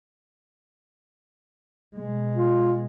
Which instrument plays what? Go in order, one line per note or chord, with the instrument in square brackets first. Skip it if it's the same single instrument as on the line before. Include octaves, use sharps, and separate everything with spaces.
[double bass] B2 G#3
[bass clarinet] F4